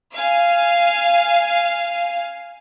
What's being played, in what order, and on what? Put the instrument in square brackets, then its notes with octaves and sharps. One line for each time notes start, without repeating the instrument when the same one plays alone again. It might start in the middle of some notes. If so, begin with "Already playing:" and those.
[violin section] F5 G#5